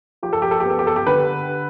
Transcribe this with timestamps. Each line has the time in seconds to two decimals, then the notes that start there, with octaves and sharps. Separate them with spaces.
0.23 F3 G4
0.33 A4
0.42 G4
0.51 A4
0.60 G4
0.65 B3 A4
0.79 G4
0.87 A4
0.96 G4
1.07 D3 B4